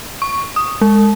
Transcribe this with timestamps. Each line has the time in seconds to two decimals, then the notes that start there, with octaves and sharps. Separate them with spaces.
0.22 C#6
0.56 D#6
0.82 G#3